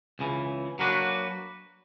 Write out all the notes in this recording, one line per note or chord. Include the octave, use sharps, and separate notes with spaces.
C#2 C#3 E3
F#3 A#3 D4 F#4 B4